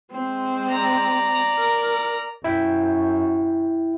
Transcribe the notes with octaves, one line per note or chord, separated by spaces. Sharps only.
G#3 C4
D5 A#5
A#4
F#2 E4 E5 G5